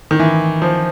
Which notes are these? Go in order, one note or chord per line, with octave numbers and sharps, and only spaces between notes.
D#3
E3
F3